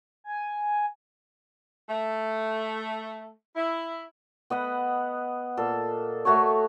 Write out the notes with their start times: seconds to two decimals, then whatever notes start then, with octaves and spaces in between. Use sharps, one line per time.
0.24 G#5
1.88 A3
3.55 E4
4.50 B3 D#5 F#5 B5
5.57 A#2 A4
6.25 A3 F#4 A4 C#5